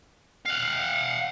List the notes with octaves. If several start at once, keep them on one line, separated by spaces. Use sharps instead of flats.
F5 F#5